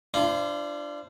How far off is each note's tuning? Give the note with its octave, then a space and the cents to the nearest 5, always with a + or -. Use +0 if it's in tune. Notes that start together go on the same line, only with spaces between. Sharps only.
D4 +0 F4 -40 C5 +0